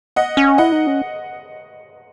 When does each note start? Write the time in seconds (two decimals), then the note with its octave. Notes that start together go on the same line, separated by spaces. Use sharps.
0.16 D#5 F#5
0.37 C#4
0.58 E4 D#5 F#5
0.72 D#4
0.87 C#4